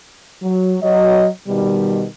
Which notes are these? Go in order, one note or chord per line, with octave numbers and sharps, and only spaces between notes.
F#3
F#3 D#5
B2 D#3 G3